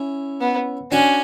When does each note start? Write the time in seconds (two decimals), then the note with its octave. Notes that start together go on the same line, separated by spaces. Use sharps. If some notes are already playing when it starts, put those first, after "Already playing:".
Already playing: C#4 E4
0.41 B3
0.92 C#4 D4 F#4